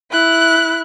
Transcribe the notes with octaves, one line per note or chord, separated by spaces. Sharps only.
E4 F#6